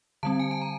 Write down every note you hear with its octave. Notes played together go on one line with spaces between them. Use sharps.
D3 G3 C4 A5
G#5
A5
A#5